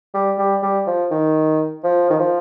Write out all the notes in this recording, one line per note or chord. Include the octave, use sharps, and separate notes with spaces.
G3
G3
G3
F3
D#3
F3
D#3
F3